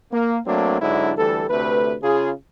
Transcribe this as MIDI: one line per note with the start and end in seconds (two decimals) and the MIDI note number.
0.12 0.39 58
0.46 0.80 54
0.46 0.80 57
0.46 0.80 58
0.46 0.80 60
0.46 0.80 62
0.81 1.12 44
0.81 1.12 50
0.81 1.12 54
0.81 1.12 62
0.81 1.12 64
1.18 1.44 38
1.18 1.44 52
1.18 1.44 55
1.18 1.44 69
1.50 1.95 38
1.50 1.95 48
1.50 1.95 57
1.50 1.95 71
2.02 2.31 49
2.02 2.31 65
2.02 2.31 68